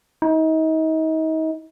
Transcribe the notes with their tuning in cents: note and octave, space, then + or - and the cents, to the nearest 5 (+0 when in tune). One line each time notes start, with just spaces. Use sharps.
D#4 +35